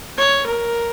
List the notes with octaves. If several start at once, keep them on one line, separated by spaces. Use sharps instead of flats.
C#5
A#4